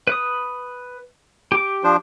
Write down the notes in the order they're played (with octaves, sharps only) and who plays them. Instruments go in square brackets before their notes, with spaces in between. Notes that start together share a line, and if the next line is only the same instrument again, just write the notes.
[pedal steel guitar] B4 D#6
G4 D6
[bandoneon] F3 D4 C5